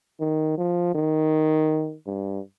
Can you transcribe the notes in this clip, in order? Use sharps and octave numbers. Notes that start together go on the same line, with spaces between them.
D#3
F3
D#3
G2